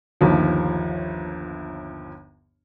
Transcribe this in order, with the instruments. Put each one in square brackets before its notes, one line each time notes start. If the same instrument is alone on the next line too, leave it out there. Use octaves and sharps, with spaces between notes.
[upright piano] G1 D#2 F3